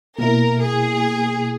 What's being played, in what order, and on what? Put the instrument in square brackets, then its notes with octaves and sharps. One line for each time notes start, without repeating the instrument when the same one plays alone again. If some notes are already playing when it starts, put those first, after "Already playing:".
[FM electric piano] B2 A#3 E4 [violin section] A#4
[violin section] G#4